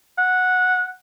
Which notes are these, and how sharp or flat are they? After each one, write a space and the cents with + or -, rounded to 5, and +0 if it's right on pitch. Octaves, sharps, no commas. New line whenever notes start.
F#5 -10